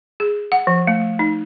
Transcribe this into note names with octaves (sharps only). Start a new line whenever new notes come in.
G#4
F#5
F3
A3
D#4